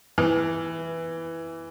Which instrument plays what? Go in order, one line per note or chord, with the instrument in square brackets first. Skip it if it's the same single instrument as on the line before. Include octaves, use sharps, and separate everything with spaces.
[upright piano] E3